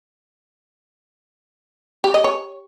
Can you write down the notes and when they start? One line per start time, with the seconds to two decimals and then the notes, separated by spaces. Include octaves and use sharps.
2.04 G4
2.14 D#5
2.24 C#5